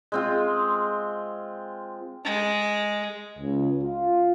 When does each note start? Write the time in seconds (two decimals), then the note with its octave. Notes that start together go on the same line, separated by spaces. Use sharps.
0.12 G#3 C4 F4
2.25 G#3
3.39 C#2
3.84 F4